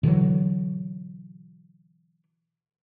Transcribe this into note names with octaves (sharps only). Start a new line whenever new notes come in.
B2 D3 E3 F#3